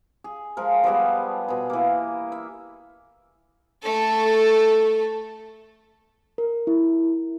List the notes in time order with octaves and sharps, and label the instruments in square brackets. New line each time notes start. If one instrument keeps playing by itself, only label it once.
[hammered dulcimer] G#4
F3 G#3 A#4
F3 G3 B3 G#4
B2 G#4
E3 A#3
E5
[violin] A3 A4
[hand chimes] A#4
E4